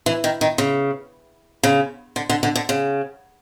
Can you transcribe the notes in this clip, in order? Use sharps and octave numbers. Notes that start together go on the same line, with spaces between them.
E3
D#3
D#3
C#3
C#3
D3
D3
D3
D3
C#3